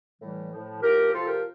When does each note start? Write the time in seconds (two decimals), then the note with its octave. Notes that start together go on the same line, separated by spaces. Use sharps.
0.21 A2 E3 G3
0.52 A2 F3
0.82 A2 F3 G4 A#4
1.12 C3 F3 F4 A4
1.27 G4 A#4